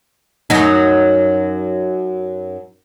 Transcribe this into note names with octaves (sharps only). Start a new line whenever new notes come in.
F#2 F#3 D#4